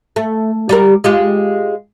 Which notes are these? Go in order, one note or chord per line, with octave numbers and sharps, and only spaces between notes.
A3
G3 G4 A#4
G#3 F4 G4